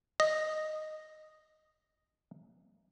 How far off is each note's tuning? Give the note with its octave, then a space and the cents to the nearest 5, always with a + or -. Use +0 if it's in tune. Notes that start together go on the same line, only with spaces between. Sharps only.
D#5 -5